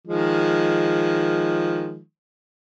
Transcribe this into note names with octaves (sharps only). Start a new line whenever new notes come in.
D#3 F3 G#3